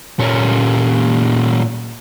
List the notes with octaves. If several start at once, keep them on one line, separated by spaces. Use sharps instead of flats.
A#2 C#4